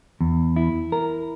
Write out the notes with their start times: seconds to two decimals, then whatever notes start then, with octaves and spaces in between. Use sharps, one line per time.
0.21 E2
0.56 E4
0.92 A#4